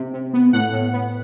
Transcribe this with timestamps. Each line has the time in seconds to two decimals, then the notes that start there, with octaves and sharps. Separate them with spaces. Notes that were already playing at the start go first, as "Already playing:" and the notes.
Already playing: C3
0.14 C3
0.33 B3
0.53 A2 F#5
0.73 A2
0.93 B3